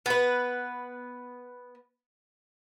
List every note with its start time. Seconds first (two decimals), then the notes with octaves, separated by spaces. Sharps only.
0.06 B3 B4